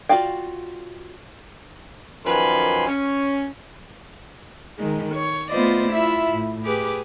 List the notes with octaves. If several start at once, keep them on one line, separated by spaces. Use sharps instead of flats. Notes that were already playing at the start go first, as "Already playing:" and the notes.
F4 F#4 D5 F5 G5
F#2 D#3 F3 B4 G#5 C6
C#4
D#3 G#3
C#5
A3 B3 F4 C5 D5 D#5
E4 F4 E5
A2
G4 G#4 B4 D6